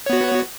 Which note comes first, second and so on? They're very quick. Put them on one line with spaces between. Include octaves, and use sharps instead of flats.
C#5 B3 F#4